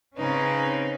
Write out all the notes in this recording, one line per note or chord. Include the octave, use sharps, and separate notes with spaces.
C#3 C4 C#4 D#4 B4